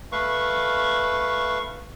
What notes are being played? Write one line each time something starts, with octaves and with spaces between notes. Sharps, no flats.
A3 B4 F5 C#6